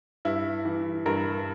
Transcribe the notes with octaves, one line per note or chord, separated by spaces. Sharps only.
G2 E4
E3
G2 A#4